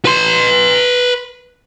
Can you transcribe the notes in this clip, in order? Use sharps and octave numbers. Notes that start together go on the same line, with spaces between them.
B4 C6